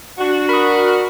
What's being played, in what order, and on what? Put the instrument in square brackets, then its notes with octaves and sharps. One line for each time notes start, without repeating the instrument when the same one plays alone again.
[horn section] D4 F#4
[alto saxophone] A#4 [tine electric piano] B5 D#6